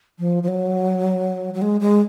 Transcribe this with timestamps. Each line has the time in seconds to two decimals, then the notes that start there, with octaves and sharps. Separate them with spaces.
0.19 F3
0.43 F3
0.48 F#3
1.54 F#3
1.62 G#3
1.81 G#3